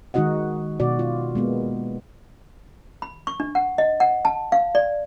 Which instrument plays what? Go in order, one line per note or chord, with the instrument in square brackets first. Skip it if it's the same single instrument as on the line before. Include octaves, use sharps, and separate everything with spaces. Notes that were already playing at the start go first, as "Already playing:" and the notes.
[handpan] D#3 G#3 D#4 F#4 D#5 F#5
B2 F#4 D5
F4
G#3 A#3 B3
[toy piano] B5
C#6
D4
F#5
D#5
F#5
A5
F5
D5